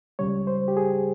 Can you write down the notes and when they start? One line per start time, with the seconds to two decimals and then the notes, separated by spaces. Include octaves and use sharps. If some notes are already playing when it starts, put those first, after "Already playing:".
0.19 C#2 C#3 G3 C#5
0.47 C5
0.68 G4
0.77 G#4